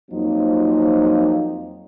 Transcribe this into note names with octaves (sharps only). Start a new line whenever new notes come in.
F2 F3 F#3 A#3 C4 D#4